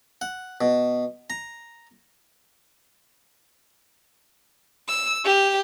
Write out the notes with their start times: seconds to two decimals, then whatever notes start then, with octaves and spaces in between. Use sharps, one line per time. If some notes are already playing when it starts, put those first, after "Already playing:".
0.21 F#5
0.61 B2
1.30 A#5
4.88 E6
5.25 G4